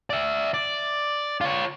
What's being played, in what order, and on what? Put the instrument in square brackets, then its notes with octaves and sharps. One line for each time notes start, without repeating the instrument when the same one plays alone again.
[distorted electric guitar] D5 E5
D5
F4 C#5